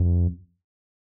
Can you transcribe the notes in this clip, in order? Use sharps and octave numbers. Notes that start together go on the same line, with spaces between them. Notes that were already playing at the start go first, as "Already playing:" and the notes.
Already playing: F2